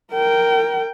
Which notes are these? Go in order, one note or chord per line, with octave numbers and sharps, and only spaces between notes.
A#4 G5